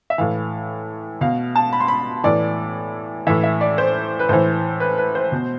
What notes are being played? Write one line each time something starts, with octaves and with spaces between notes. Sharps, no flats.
E5
A2 E3 F5
B2 F5
A5
B5
C6
B5
A2 E3 D5
A2 E3 E5
E5
D5
C5
B4
A2 E3 C5
B4
B4
C5
B2